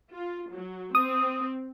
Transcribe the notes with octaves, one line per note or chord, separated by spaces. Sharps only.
F4
F#3
C4 D#6